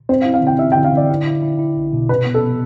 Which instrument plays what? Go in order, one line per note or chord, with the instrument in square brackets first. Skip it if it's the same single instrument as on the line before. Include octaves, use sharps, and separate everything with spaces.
[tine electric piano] C4 [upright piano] C5
[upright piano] F5
[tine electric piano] E4
[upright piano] F5
[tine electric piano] D3 [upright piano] G5
[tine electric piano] E4 [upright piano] E5
[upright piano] G5
[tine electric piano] D3
[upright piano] F5
[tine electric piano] D3 [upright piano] D5
[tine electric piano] E4
E4
E4
E4
B1
B2
[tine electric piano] C3 [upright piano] B4
[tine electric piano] B3
[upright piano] A4
[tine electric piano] B3